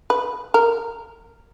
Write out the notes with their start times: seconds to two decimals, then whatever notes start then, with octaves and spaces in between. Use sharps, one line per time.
0.10 B4
0.54 A#4